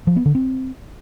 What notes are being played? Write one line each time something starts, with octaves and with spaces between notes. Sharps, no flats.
F3
B3
D3
C4